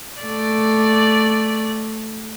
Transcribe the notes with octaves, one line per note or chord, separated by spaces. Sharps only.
A3 D5